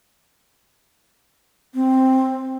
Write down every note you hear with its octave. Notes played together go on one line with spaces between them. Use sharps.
C4